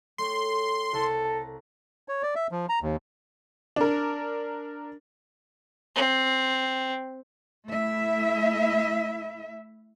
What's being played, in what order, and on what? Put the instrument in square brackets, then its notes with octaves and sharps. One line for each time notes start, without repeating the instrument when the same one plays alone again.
[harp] A3 C#5 G5 [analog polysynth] C6
[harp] C2 [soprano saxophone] A4
[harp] A5 A#5
[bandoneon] C#5
D5
E5
F3
A#5
D#2
[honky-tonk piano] D4 A#4
[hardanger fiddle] C4
[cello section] A3 E4 E5